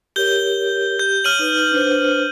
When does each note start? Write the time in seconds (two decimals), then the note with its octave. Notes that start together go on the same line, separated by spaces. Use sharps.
0.16 G4 A#4 C#5 G6 G7
0.99 G4 G6
1.24 C#5 F6 D#7 F#7
1.39 D#4 B4
1.72 D4 B4 C5